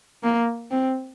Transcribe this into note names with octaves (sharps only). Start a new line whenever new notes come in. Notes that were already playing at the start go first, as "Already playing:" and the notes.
A#3
C4